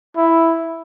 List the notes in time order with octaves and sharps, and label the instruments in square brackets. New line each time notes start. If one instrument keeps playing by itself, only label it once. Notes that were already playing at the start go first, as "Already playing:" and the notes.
[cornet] E4